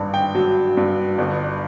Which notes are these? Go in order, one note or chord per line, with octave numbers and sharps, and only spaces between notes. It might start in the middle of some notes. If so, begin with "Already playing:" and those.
Already playing: G#1 G2
G5
F#3
G2
G1